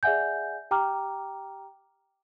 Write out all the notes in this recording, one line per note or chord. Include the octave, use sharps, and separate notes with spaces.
G#4 D5 E5 F#5 G#5 G6
G4 G5 A#5 D6 F6